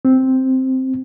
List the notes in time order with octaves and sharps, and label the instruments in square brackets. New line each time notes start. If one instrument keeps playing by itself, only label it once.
[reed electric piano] C4